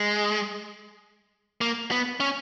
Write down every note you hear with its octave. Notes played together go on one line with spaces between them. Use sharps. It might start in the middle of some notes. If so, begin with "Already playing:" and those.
Already playing: G#3
A#3
B3
C#4